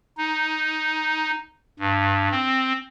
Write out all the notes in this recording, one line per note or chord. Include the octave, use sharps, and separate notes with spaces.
D#4
G2
C4